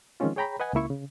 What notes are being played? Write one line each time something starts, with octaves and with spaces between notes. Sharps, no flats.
D#3 F3 G#3 C4 C#4 F4
G#4 C#5 G5 A#5 B5
B4 D#5 F#5 G#5
C#2 C#3 A#3 E4 C#6
C#3